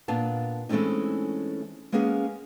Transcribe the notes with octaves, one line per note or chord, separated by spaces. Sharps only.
A#2 B3 D4 F5 A5
E3 G#3 A3 C4 C#4 D#4
G#3 A#3 B3 C#4 G#4